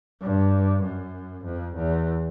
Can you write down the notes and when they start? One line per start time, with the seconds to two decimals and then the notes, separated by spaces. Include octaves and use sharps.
0.21 G2
0.83 F#2
1.45 F2
1.76 E2